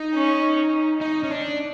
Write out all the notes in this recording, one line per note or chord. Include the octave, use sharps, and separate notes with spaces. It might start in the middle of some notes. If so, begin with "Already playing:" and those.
Already playing: D#4
C#4
D#4
C#4
D4